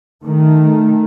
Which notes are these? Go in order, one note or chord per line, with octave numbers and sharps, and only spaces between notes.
D#3 A3